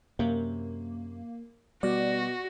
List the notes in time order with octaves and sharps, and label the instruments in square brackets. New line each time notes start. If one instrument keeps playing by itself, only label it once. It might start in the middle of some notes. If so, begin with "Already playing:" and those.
[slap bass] F#2 C3 [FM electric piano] A#3
[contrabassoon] B2 [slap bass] G3 [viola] F#4 [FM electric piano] D5